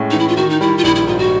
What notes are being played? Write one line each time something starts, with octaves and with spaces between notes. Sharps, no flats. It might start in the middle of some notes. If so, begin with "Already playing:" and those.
Already playing: A2 G#3 C#4
E3 D#4
E4
F4
D#3 F#4
D#4
G3 E4
F4
A#1 E4
E4
G#2 F4
F#4